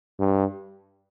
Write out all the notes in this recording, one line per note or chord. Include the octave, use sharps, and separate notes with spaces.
G2